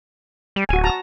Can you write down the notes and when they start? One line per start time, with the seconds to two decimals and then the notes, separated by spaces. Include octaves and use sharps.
0.56 G3
0.69 D1 F#4 G#5
0.84 F#4 A5 A#5